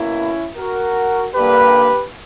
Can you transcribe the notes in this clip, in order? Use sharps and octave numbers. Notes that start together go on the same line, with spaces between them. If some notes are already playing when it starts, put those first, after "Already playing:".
Already playing: B2 A#3 C#4 E4
F#4 A#4
G2 D3 G3 A#3 G4 B4